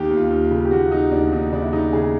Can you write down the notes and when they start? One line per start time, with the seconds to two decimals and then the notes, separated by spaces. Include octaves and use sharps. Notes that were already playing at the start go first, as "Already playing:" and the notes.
Already playing: D#2 G4
0.11 D#2
0.17 F4
0.30 D#2
0.44 F4
0.51 C#3
0.65 G4
0.71 D#2 F#4
0.91 F3 D#4
1.11 D#2 D4
1.32 D#2 D#4
1.52 C#3 D4
1.63 E4
1.73 C#3 D#4
1.93 C#3 G#4